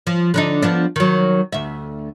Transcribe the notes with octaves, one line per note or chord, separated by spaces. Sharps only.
F3
D3 D4 D#4
F3 B3 D4
D#3 F#3
D2 E5